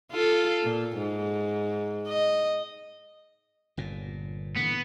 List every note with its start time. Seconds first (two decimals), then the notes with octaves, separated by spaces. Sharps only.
0.12 F4 A4
0.64 A#2
0.98 G#2
2.08 D#5
3.77 G1 A#2
4.56 A#2 D3 E3 B3